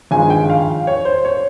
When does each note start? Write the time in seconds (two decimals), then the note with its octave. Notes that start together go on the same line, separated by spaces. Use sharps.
0.11 G#1 G2 F3 G#3 G#5
0.30 G5
0.50 F5
0.87 C#5
1.05 C5
1.25 C#5